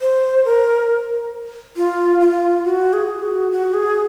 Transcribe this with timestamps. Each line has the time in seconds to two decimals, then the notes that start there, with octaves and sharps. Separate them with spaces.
0.01 C5
0.45 A#4
1.77 F4
2.20 F4
2.64 F#4
2.93 G#4
3.23 F#4
3.52 F#4
3.73 G#4